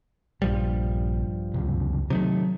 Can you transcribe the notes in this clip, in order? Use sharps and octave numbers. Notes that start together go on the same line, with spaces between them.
A#1 G2 F3 G3
C#2 F#2 C3
C3 D#3 F#3 A3